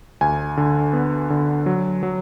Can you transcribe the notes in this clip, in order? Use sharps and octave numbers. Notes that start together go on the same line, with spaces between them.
D2 G#5
D3
B3
D3
F#3
F#3